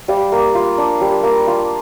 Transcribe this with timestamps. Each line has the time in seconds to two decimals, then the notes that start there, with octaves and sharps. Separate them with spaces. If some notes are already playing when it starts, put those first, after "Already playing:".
0.08 G3 D5 F5
0.32 A#3
0.55 F4
0.78 D4
1.01 G3
1.23 A#3
1.47 F4